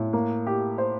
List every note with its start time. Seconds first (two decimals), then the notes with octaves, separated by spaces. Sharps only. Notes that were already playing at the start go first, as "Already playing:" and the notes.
Already playing: A2
0.13 A#3
0.47 G4
0.78 C5